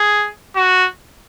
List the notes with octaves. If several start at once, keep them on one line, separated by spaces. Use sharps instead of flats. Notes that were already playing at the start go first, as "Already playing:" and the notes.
Already playing: G#4
F#4